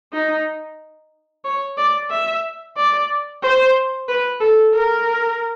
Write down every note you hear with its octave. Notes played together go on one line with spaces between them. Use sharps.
D#4
C#5
D5
E5
D5
C5
B4
A4
A#4